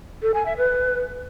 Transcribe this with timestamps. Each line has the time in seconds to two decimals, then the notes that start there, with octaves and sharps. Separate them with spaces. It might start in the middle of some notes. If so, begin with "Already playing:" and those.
0.22 A4
0.34 G#5
0.46 E5
0.57 B4